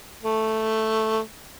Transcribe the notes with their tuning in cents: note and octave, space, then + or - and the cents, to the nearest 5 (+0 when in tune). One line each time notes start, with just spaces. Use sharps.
A3 +0